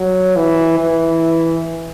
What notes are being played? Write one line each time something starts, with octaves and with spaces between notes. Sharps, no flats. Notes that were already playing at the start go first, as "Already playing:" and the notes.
Already playing: F#3
E3
E3